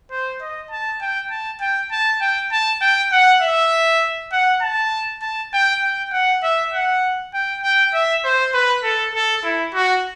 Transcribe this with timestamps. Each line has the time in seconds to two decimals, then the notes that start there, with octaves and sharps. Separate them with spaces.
0.11 C5
0.41 D#5
0.71 A5
1.01 G5
1.30 A5
1.61 G5
1.91 A5
2.21 G5
2.52 A5
2.81 G5
3.12 F#5
3.42 E5
4.32 F#5
4.62 A5
5.22 A5
5.53 G5
5.83 G5
6.12 F#5
6.43 E5
6.73 F#5
7.34 G5
7.63 G5
7.94 E5
8.24 C5
8.54 B4
8.83 A4
9.15 A4
9.44 E4
9.74 F#4